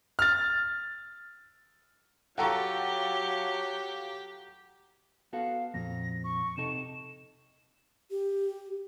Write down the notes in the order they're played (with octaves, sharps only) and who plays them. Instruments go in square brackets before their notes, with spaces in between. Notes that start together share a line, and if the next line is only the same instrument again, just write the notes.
[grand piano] F6 A6
[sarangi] F#3 [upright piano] F4 A4 G5 [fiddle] G4 [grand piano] F#5 A#5 C#6
[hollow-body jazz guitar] B3 F#4 A4 [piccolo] F5
[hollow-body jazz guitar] F2 A#2 [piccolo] A#6
[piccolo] C#6
[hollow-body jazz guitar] C3 D#4 A4 [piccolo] E7
[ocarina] G4